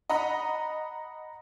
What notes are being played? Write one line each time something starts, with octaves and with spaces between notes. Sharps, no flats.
D#5 F#5 A#5 B5